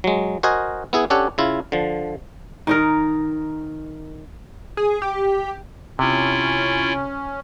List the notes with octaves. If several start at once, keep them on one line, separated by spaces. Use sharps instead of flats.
F#3 G#3
F#4 A#4 C5 D#5 G#5
B3 E4 G#4
C#4 D4 G4 A4 C#5 F#5
C#3 E4 F4
D3 F3
D#3 D#4 A#4
G#4
G4
C3 C#4 E4 F4